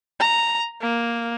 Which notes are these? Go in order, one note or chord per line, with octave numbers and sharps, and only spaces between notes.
A#5
A#3